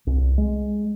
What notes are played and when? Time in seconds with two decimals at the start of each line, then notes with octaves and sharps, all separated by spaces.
0.07 C2
0.38 G#3